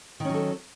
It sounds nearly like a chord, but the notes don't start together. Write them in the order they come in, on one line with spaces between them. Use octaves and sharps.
D#3 C#4 F#3 A4